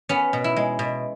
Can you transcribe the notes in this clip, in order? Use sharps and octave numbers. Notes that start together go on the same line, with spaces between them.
B3 C#4
B2
E4
G#3
B2